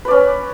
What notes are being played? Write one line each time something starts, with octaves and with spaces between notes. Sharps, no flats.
C#4 B4 D5